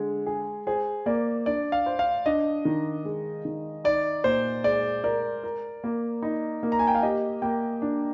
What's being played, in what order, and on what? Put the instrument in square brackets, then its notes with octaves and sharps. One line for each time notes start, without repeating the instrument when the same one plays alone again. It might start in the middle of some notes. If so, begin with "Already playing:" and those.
Already playing: [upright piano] D3 G#3
G#4
[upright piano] G#4 [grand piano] C5
[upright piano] A#3 [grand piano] D5
[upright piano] D4 [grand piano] D5
[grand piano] F5
[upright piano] C5
[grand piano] F5
[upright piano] D4 [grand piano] D#5
[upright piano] D#3
G#3
D#3
[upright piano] D#4 [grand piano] D5
[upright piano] A#2 [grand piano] C5
[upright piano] G#3 [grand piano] D5
[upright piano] A#4 [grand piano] D5
[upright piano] A#4
A#3
D#4
A#3
[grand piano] A#5
G#5
G5
F5
[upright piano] G4 [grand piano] D#5
[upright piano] A#3 [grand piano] G5
[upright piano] D4